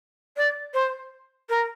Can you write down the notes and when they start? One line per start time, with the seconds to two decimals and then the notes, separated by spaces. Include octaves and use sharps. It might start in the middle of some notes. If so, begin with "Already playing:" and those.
0.37 D5
0.74 C5
1.49 A#4